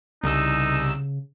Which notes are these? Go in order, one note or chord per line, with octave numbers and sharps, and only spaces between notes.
C2 C#3 D#4 E6